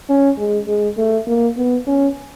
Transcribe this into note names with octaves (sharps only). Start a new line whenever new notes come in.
C#4
G#3
G#3
A3
A#3
B3
C#4